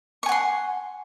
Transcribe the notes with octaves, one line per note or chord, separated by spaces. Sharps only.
F#5 G#5 C6 C#6